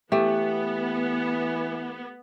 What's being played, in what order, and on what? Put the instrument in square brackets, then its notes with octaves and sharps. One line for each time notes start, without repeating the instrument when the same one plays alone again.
[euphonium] E3 [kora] A3 [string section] B3 [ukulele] G4